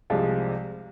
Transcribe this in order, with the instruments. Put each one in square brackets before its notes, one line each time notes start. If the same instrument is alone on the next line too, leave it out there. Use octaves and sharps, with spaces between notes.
[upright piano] C2 C3 F3 G#3